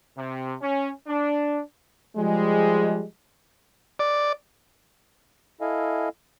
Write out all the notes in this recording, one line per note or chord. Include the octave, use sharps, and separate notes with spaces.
C3
C#4
D4
F3 G3 G#3
D5
E4 A4 D#5 F5 G#5